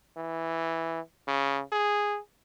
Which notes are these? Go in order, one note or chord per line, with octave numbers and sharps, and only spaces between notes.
E3
C#3
G#4